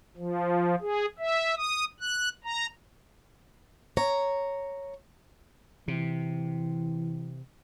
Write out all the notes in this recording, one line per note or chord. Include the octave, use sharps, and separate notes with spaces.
F3
G#4
E5
D#6
F#6
A#5
C#5 A#5
C3 E3